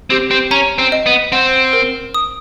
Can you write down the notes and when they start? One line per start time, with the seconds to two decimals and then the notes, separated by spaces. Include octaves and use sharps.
0.10 C4 G4
0.31 C4
0.51 C#4 A#5
0.78 C4
0.92 D#5
1.06 B3
1.32 C4 F#5
1.73 A#4
2.14 D#6